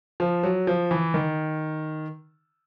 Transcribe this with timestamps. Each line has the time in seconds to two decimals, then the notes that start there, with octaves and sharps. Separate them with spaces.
0.20 F3
0.43 F#3
0.67 F3
0.91 E3
1.14 D#3